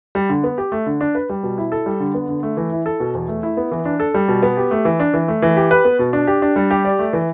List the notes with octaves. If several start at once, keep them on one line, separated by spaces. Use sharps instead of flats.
G3
D3
B3
G4
A3
D3
D4
B4
G3
B2
E4
A4
G3
D3
B3
D3
A3
E3
E4
A4
B2
E2
A3
E4
B3
E3
D4
A4
G3
B2
B3
G4
A3
E3
D4
E3
A3
E3
G4
B4
B3
B2
D4
G4
D4
G3
G4
D5
A3
E3